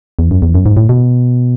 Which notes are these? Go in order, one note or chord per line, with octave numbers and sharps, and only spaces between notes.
E2
F#2
E2
F#2
G#2
A2
B2